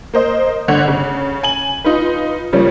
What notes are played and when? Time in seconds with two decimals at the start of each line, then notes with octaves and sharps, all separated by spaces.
0.13 A#3 C5 D#5
0.68 G1 D3 C#5 F#5
0.88 C#3
1.43 G#5 F#7
1.84 D#4 F4 B4
2.53 C#3 F3 G3 A#3 C#4